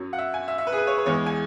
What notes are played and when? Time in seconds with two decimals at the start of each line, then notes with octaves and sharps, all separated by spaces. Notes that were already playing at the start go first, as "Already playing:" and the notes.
Already playing: F#2 F#3
0.13 F#5
0.18 E5
0.34 G#5
0.48 E5
0.58 E5
0.67 B4
0.72 G#4
0.77 B4
0.87 C#5
0.98 B4
1.06 E2 E3 G#3 C#5
1.26 G#5